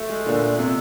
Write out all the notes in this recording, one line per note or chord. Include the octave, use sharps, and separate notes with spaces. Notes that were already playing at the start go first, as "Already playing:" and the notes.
Already playing: A3
G#3
A#2 D3
C3